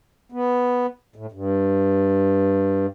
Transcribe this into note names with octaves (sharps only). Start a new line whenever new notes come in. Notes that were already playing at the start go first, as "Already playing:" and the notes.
B3
A2
G2